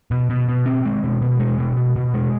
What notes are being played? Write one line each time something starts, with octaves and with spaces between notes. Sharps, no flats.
B2
B2
B2
C4
G#3
B2
B2
G#3
B2
B2
B2
G#3